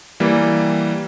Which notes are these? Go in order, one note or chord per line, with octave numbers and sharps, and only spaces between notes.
E3 G3 A#3